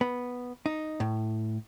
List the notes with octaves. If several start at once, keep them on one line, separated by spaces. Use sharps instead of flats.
B3
D#4
A2